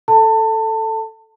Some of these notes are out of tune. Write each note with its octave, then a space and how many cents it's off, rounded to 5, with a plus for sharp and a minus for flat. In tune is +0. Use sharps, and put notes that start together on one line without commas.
A4 +0 A5 +25